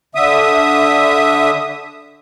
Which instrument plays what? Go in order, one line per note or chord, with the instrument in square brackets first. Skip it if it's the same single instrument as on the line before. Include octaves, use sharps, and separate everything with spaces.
[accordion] D3 E5 D#6